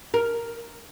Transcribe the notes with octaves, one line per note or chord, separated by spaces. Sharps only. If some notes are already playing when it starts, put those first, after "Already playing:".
A#4